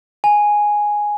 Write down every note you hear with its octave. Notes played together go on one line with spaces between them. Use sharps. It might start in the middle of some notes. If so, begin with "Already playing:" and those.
G#5